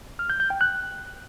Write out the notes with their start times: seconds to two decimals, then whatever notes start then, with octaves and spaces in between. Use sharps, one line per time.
0.19 F6
0.30 G6
0.40 G6
0.50 G5
0.61 F#6